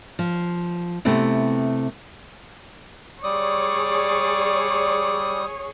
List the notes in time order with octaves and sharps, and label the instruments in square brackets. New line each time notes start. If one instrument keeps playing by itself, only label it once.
[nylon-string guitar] F3
C3 A3 B3 C4 E4
[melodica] G3 D#6 [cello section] G#4 C#5 [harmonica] D5